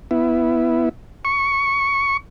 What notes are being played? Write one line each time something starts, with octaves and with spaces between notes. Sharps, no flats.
B3 E4
C#6